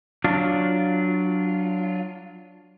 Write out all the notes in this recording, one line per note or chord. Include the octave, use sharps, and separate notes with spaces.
F#3 D4 F4